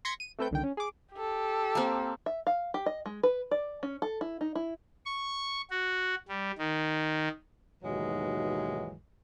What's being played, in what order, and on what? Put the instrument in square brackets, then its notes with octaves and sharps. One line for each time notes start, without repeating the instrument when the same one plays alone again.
[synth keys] C6 G#6 A#6 B6 C#7
D#7
A3 C4 A4 B4 G5 G6
C2 D3 D#3 G5
C#4
G#4 D6
[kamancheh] G4 A4
[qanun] A#3 C4
[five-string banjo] E5
F5
G4
D#5
G#3
B4
D5
C#4
A4
E4
D#4
E4
[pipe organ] C#6
F#4
G3
D#3
[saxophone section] D#2 G#2 B2 E3 F#3 G#3